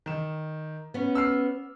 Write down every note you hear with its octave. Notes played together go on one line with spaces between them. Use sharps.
D#3 E7
B3 C#4
E6 F6 C7